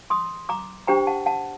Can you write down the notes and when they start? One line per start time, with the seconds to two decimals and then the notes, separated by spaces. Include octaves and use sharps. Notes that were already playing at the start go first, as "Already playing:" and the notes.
0.10 C6 D#6
0.49 A#5 D6
0.87 D4 G4 C5 G5 A#5
1.07 F#5 A5
1.26 F#5 A5